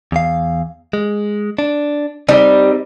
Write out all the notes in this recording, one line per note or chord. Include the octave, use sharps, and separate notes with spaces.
E2 F5
G#3
D4
G3 C4 D#4